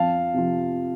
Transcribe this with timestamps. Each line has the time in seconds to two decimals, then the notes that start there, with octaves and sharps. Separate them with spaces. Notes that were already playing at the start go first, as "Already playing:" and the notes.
Already playing: F2 F5 A5
0.34 C3 F3